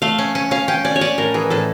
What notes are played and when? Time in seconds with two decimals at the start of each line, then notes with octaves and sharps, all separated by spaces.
0.02 A3 F5
0.18 C#4
0.35 C#4
0.51 C#4 F5
0.68 C#4 G5
0.85 C#4 D5
0.96 C#5
1.01 C#4 D5
1.18 A2 A#4
1.34 E3 G#4
1.50 A2 A4